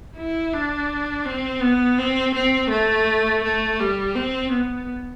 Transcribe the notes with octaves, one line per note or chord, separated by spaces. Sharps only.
E4
D4
C4
B3
C4
C4
A3
A3
G3
C4
B3